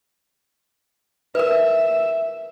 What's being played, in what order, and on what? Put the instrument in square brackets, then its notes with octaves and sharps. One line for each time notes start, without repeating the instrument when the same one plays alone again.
[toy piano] A#4 B4 [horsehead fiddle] E5